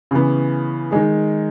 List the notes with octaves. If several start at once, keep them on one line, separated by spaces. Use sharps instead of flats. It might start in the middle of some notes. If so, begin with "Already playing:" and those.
C#3 E3 B3
D#3 G#3 D#4 G#4